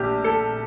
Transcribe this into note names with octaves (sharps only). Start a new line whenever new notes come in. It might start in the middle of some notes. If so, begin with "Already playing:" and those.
Already playing: A#1 A#2 G4
A4